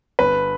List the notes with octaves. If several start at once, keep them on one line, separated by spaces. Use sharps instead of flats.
G1 B4